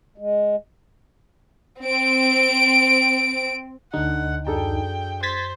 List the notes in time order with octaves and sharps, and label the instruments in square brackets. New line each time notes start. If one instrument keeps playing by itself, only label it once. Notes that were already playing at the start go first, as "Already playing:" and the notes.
[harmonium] G#3
[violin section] C4 D7
[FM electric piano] D2 D#4 [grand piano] D3 [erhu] F#5
[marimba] F#2 [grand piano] D4 G#4 A4 [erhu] G5
[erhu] C5 [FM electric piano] G#6 A6 B6